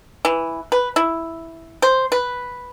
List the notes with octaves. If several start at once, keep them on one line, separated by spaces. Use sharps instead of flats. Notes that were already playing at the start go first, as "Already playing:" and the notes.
E3
B4
E4
C5
B4